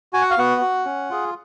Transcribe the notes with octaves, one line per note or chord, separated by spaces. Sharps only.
F#4 G#5
F#5
F5
B3 F#4 F#5
F#4
C#4
F4 G#4